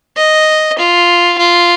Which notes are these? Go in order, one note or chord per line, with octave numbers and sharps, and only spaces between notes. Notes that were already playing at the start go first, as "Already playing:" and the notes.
D#5
F4
F4